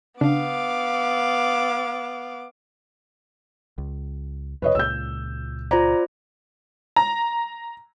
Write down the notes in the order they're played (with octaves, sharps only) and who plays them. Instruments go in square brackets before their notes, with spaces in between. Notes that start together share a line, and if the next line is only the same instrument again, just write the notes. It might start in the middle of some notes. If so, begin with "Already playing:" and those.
[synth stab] C#3 D4 [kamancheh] B3 D6 [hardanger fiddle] F5
[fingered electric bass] C#2
[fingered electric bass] F2 C3 [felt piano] B4 C#5 D#5
[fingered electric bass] C#2 A#2 [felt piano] E6 G6
[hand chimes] F4 C5 D5 [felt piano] A#5
[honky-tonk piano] A#5